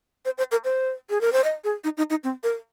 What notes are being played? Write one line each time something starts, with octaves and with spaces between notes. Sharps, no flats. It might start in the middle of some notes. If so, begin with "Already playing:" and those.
C5
C5
A#4
C5
G#4
A#4
C5
D#5
G#4
D#4
D#4
D#4
C4
A#4